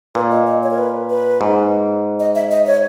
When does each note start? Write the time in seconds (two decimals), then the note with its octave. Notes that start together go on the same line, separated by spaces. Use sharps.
0.15 A#2 B4
0.31 D#5
0.46 D#5
0.63 C#5
0.70 A#4
0.78 B4
1.10 B4
1.41 G#2
2.20 D#5
2.35 E5
2.51 D#5
2.66 C#5